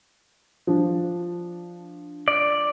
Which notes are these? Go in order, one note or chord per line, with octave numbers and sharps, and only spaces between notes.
F3 D4
D5